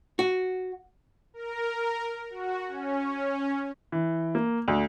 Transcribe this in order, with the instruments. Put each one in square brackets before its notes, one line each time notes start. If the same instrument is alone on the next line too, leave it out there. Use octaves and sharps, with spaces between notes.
[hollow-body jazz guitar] F#4
[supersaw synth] A#4
F#4
C#4
[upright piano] E3
A#3
D2